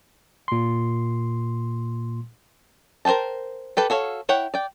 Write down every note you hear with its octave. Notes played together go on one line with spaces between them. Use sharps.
A#2 C6
A#4 C5 E5 G5 A5
G4 A4 B4
F#4 A4 C#5 F5
E4 C#5 F#5 G5
D5 G5